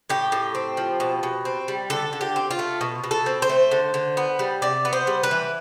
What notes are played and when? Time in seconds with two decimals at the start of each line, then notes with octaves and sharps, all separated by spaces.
0.10 A2 G4
0.32 A2
0.55 C4
0.77 F3
1.00 B2
1.23 B2
1.45 C4
1.68 G3
1.90 D3 A4
2.13 D3
2.21 G4
2.36 C4
2.51 F4
2.59 A3
2.81 B2
3.04 B2
3.11 A4
3.26 C4
3.42 C5
3.49 A3
3.71 D3
3.94 D3
4.17 B3
4.39 G3
4.62 C3 D5
4.85 B3
4.93 C5
5.07 G3
5.23 B4
5.31 E3